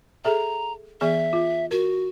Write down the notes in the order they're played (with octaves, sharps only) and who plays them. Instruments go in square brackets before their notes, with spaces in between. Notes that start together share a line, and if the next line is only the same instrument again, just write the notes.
[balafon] G#4 A4 E5 [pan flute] A#5
[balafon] E3 B3 G#4 [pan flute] E5
[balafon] F4
[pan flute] F#4 [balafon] A#4